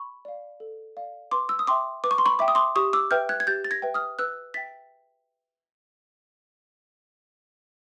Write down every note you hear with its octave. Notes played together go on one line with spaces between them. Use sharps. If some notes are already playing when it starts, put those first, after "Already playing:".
Already playing: B5 C#6
D5 F5
A4
D5 F5
B4 C6 D6
E6
D#6
E5 G5 C6 D6
B4 D6
C#6
C6
B5 C#6
E5 G5 D6
D#6
C6 D6
G4 C#6 D#6
D6 E6
B4 E5 G5 F6 G6
F#6 G#6
G#6
G4 G6 A6
A6
G#6 A#6
B4 E5 G5
D#6 F6
B4 E6 F#6
E5 G5 A6 B6